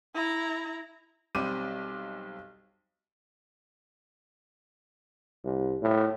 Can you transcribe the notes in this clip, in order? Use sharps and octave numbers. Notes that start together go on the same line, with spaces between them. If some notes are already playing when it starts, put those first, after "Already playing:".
E4 A#5
B1 G3 C4 D6 D#7
C2
A2